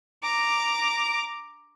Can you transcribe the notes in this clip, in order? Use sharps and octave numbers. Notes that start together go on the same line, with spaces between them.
A#5 D6